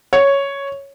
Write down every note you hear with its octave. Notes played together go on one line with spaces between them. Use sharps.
C#5